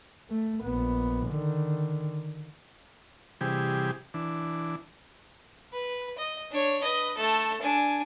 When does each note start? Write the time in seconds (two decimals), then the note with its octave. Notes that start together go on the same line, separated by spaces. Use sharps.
0.30 A3
0.64 A#1 B3
1.27 D3 D#3
3.41 C3 E3 G3 G4 G#4
4.14 E3 D4
5.73 B4
6.18 D#5
6.51 D4 C#5
6.83 B4 D#5
7.17 A3 A4
7.62 D4 G#5